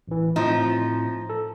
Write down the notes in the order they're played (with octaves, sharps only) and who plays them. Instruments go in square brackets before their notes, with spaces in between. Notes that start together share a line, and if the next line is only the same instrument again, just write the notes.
[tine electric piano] A1 E3
[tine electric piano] A2 C4 [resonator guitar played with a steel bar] F3 D#4
[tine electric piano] A4